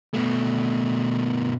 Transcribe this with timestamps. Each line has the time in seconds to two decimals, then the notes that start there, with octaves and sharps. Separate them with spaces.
0.14 B2 A3